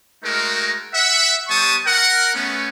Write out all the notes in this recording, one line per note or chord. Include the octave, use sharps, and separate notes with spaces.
G#3 A3 D#4 F#4 A#4
E5 F#5
G3 B3 C5 A5 C#6 D#6
A#4 F#5
A3 B3 C#4